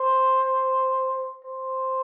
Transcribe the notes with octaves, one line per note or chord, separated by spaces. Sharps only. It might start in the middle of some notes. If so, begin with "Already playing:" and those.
Already playing: C5
C5